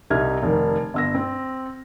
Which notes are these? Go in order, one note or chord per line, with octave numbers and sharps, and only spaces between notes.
C2 C3 D#4 E5 F6 G#6
F1 D#3
G1 E6 A#6
C4